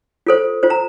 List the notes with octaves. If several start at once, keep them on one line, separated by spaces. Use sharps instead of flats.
F4 A4 C5
F4 C5
A#5